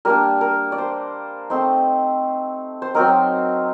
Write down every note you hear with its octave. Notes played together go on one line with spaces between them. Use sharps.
G3 A#3 D4 A#4
A#4
D5
C5
A3 C4 D#4 C5
C5
F#3 C4 D#4 A#4